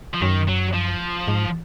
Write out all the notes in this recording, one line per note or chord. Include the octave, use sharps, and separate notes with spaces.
F3
F#2 D#3
F#3
F3
G#2